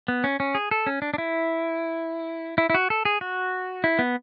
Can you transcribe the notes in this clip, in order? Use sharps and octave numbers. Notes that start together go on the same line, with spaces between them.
B3
C#4
C#4
G#4
A4
C#4
D4
D4
E4
E4
E4
F#4
A4
G#4
F#4
E4
B3